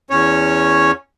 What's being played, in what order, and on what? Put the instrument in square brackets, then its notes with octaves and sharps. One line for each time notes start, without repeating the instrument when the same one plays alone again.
[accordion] E2 C#4 C#5